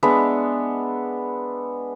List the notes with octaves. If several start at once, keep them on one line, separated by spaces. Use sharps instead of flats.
G#3 B3 D4 E5